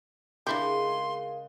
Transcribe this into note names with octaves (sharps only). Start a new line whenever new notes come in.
C#3 G#3 D4 E4 G4 A#4 F5 C6